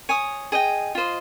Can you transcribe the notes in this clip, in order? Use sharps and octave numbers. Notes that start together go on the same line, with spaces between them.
C#5 G#5 D#6
G#4 D#5 G5
F4 C5 D#5